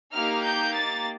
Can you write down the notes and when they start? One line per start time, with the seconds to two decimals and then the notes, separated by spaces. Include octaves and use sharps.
0.14 A#3 D#4 G4 F6
0.44 G6
0.74 A6